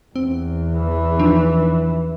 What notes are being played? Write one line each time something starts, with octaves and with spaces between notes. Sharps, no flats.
E2 C4
E3
F3 D4 D#4